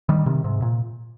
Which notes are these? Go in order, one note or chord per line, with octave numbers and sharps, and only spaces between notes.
D#3 G3
C3 D#3
G#2 C3
A#2